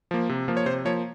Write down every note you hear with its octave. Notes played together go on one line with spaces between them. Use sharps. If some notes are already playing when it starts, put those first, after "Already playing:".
F3 A#3
C3
F3 A#3
C#5
C3 C5
F3 A#3 C#5